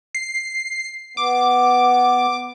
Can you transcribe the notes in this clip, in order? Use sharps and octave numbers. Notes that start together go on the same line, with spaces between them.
C7
B3 D6